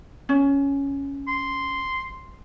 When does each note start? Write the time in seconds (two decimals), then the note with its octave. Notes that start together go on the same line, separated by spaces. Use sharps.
0.29 C#4
1.28 C6